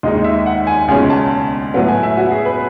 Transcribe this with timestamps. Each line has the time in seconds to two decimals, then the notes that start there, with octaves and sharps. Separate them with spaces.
0.03 D#2 D#3 G#3 D#4 D#5
0.24 E5
0.46 F#5
0.67 G#5
0.88 C#2 B2 G#3 C#4 G#5
1.10 A5
1.74 A2 F#3 B3
1.89 G#5
2.03 E5
2.17 F#4
2.31 G#4
2.45 B4